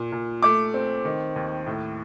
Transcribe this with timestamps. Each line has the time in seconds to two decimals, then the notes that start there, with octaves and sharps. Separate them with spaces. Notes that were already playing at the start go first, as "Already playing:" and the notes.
Already playing: A#2
0.12 A#2
0.43 A3 D6
0.74 C4
1.05 D#3
1.36 D#2
1.66 A2